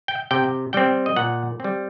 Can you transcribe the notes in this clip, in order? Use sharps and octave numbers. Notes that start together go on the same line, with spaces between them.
G5
C3 G5
G3 C4 G5
D#5
A#2 F#5
G3 C4